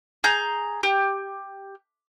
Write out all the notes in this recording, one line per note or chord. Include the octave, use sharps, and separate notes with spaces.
G#4 A#5 G6
G4